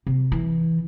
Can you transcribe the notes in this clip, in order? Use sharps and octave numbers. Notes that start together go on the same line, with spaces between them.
C3
E3